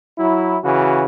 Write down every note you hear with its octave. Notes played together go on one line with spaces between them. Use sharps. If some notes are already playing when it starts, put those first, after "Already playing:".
F#3 E4
C#3 E3 F#4